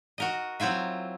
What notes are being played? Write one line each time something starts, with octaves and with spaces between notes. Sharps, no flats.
F#4 A#4 D#5
F#3 C4 E4 F4 E5